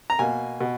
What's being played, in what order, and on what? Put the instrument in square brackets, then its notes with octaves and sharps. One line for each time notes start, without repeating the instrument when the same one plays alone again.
[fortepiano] A#5
B2 A#3 G#5
B2